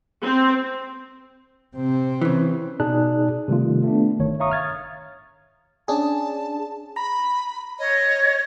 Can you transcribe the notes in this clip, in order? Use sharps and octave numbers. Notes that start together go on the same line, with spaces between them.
C4
C3 C4
C#3 E3
B2 D#4 G#4 D5 A5 F#6
C3 D#3 G3 A3 F4
A3 B3 D4
G1 D#3 C#5
C#5 E5 F5 A#5 C#6 D#6
F6 G#6 A6
C#4 D4 G#4 A5
A#5 B5
C#5 D#5